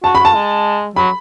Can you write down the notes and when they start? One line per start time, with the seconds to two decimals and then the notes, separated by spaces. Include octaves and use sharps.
0.04 F#4 A5
0.15 B5
0.20 F#4 A5
0.34 G#3
0.96 F#3 B5